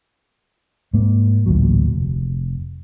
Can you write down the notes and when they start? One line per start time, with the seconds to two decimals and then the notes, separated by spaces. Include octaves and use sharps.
0.93 G#2 A#3
1.46 A1 D2 A#2 F#3
1.96 F1